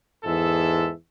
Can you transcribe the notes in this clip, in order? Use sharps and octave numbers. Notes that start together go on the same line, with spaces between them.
E2 G#2 G#3 A4 E5